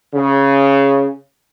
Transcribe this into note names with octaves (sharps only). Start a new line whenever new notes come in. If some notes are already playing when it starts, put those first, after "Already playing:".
C#3